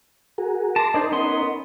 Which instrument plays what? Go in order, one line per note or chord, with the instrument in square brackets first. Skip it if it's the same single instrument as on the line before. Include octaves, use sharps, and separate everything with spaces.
[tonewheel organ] F#4 G#4 A#4
[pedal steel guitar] A5 [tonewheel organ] C6 D6 A#6
[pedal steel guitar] D4 G#4 C5 [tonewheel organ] D#4 A#4 D#5
[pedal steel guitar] B3 C#4 C6